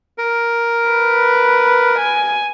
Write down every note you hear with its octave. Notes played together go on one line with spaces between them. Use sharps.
A#4
B4
G#5